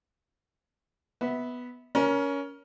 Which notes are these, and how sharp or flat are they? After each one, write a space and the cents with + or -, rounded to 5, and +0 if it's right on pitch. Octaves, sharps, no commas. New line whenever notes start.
B3 +0 E5 -25
C#4 +20 A#4 +15 A#5 +45